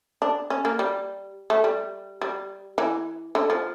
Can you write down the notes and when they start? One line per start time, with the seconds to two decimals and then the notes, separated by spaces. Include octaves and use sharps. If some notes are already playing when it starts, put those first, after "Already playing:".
0.22 D4
0.50 C#4
0.65 A#3
0.79 G3
1.50 A3
1.64 G3
2.22 G3
2.78 E3
3.35 D3
3.50 F3